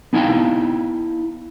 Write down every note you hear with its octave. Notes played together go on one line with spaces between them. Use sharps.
B3 D#4 E4 E5 F5 G5